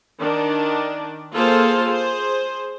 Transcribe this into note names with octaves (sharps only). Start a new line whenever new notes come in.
D#3 D4
A#3 F4 G#4 A4 C5 F5
G#4 C5